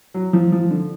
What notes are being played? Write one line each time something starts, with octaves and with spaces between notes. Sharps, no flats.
F#3
F3
F3
D3